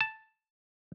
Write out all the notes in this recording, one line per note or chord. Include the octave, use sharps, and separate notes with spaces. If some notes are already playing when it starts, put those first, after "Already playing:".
A5